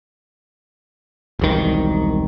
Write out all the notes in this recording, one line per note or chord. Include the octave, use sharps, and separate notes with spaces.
E1 C2 D#3